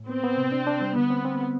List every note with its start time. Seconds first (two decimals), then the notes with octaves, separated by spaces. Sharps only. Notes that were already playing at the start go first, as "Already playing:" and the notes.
Already playing: A2
0.09 B3 C4
0.24 B3
0.37 C3
0.52 D4
0.67 D4
0.81 G3
0.96 D3 B3
1.10 C4
1.25 C4